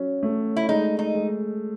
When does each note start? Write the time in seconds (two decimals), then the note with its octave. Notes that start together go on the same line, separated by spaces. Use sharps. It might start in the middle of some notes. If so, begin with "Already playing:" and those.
Already playing: F#3 C#4
0.23 A3
0.56 E4
0.69 G#3 D#4
0.99 D#4
1.14 G#3